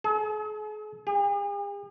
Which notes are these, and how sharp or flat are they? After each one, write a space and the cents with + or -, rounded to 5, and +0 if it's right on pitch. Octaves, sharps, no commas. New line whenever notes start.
G#4 +45
G#4 -45